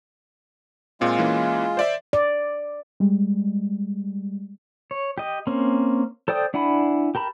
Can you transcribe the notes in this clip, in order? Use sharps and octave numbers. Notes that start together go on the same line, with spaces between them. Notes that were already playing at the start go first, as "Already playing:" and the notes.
A#2 G#3 C4 F4
E3 A#3 C#4
C5 D5 E5
D5
G3 G#3
C#5
G4 D#5
A#3 C4 C#4
A4 C5 D5 G5 D#6
D4 E4 F#5 G#5 B5
G4 A#4 A5 B5